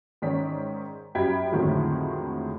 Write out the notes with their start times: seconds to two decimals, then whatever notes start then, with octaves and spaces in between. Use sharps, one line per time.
0.22 G#2 D#3 C#4 D5 B6
1.15 F#2 G3 G5 B5 G#6 B6
1.52 F2 A2 D3 D#3 F#3 G#3